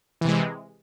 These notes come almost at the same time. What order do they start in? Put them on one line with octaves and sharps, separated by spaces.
E3 C3 G#3